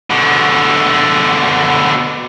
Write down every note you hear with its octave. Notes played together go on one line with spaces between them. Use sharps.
B2 D3